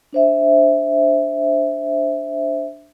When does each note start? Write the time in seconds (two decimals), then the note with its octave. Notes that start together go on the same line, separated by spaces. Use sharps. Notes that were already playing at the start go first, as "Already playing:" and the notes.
0.13 D4 C5 E5